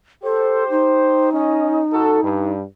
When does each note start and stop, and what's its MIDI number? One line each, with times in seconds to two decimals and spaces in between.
0.23 1.29 67
0.23 0.64 69
0.23 1.29 72
0.70 2.53 63
1.31 1.81 61
1.31 1.81 75
1.92 2.19 49
1.92 2.19 66
1.92 2.19 69
2.23 2.63 43